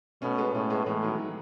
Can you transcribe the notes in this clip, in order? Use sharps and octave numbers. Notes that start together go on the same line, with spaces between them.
B2 A3 C#4
G#3 B3
A2 A3 C#4
G#3 B3
A2 E3 G#3
D#3 F#3
D#3 F#3